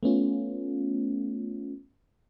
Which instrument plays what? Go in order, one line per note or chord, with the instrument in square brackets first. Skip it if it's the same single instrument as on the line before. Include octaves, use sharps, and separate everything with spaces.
[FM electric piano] A3 B3 C#4 F4